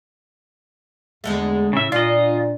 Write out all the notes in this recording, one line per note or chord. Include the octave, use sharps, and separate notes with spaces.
E2 D3 G#3 A3
A2 C#3 E5
A#2 D4 F4 D#5